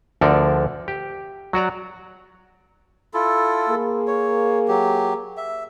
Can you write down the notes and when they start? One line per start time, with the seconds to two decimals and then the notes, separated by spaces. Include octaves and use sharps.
0.21 D2 D3 F3 A4 A#4 D5
0.88 G4
1.53 F#3 F#4 D5 A#5
3.14 E4 F4 A4
3.69 A#3 G#4
4.08 C#5
4.68 F#3 G4
5.37 E5